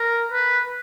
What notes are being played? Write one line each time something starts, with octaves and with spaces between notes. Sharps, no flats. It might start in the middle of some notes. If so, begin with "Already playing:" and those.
Already playing: A#4
B4